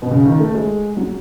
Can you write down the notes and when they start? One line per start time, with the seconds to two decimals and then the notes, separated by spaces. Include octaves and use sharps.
0.02 B2
0.11 C#3
0.25 D#3
0.40 A3
0.54 G#3
0.97 F#3